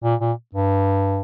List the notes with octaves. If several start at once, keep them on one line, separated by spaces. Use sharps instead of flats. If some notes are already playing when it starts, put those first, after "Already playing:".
A#2
A#2
G2